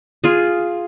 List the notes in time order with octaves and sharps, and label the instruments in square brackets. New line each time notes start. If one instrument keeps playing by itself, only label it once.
[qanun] F4 G#4